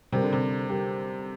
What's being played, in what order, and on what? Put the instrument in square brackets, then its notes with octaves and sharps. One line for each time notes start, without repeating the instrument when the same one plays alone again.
[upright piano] C3 [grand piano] G3 C4 G4 A#4
[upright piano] D3
C3
[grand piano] G3 C4 G4 A#4